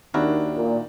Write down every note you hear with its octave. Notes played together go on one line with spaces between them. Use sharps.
D#2 D#3 D4 E4 F#4 A#4
A#2